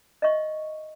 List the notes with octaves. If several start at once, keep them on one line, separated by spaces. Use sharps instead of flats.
D#5 E5 C#6